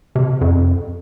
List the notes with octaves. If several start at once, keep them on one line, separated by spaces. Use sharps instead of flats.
C3
F2